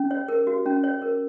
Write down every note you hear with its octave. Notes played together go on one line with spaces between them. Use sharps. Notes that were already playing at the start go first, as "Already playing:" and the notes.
Already playing: C#4
C#5
A#4
F#4
C#4
C#5
A#4